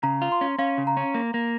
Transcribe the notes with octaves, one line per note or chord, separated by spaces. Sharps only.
C#3 A#5
F4
C6
C#4
C#4 F5
C#3
A#5
C#4
A#3
A#3